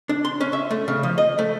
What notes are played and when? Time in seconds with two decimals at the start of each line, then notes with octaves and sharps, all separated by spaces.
0.09 D4
0.25 C6
0.41 C#4
0.53 E5
0.71 A3
0.88 C#3
1.03 F3
1.18 D#5
1.39 A3